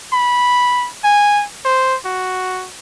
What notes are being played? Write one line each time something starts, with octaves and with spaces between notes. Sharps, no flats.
B5
G#5
C5
F#4